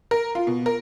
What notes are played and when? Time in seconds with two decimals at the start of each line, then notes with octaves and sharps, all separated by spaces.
0.11 A#4
0.35 F4
0.47 B2
0.66 A#4